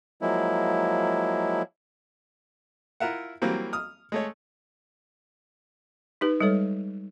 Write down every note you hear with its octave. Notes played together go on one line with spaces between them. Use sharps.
F3 F#3 G#3 A#3 E4
E4 F4 A#4 E5 F#5
E3 F#3 G3 A#3 C4
D#6 F6
G#3 A3 C#5
D#4 G4 B4
G3 G#3 A4 C#5